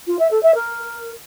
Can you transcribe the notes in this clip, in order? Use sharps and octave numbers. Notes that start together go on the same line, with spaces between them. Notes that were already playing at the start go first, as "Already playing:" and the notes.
F4
E5
A4
E5
A#4